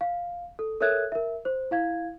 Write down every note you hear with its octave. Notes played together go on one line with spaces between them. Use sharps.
F5
A4
A4 A#4 C#5 E5 F#6 G#6
A#4 E5
C5
E4 F5 G#6